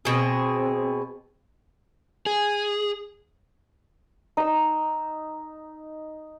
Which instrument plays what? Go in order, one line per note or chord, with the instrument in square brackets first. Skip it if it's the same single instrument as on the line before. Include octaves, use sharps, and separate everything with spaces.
[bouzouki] B2 G#4 [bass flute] C4
[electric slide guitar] G#4
[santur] D#4 E6